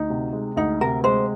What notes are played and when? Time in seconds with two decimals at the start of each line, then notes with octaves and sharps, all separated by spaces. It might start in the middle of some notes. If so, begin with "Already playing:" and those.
Already playing: D2 D#4
0.10 C3
0.33 G#3
0.56 D2 D#4
0.81 C3 A#4
1.04 G#3 C5